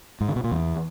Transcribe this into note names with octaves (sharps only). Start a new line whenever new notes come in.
G#2
D3
B2
A#2
E2